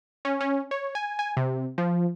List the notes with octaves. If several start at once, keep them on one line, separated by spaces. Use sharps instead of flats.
C#4
C#4
C#5
G#5
G#5
C3
F3